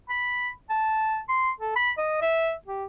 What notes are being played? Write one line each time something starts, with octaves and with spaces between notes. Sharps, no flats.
B5
A5
C6
A4
B5
D#5
E5
G4